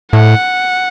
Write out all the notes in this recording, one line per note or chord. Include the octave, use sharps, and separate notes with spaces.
A2 F#5